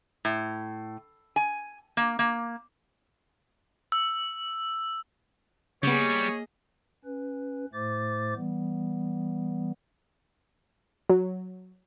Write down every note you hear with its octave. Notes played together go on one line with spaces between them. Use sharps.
A2
G#5
A#3
A#3
E6
C#3 G3 A#3 B3 G#4 C#5 D#5
C#4 B4
A2 A3 C5 D6 A6
E3 G3 B3
F#3